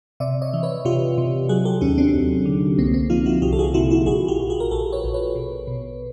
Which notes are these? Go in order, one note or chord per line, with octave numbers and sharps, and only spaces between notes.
C3 D5 E5
C#5 D#5
E3
B4 C#5
C3 F4 G4
C3
F#3 F#4 G#4
G4 A4
D#2 C#4 D#4
C4 D4
D#2
D3
C2 A#3 C4
A#3 C4
F3 D#4 F4
E4 F#4
C2 F4 G4
A4
F#4 G#4
C3 E4 F#4
E4 F#4
A#1 F#4 G#4
F4 G4
A#1
F#4 G#4
A#4
A#1 G4 A4
B4 C#5
A#1
B4 C#5
B2
B2